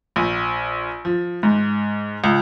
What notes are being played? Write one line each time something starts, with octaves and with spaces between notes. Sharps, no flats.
A#1
F3
G#2
C#2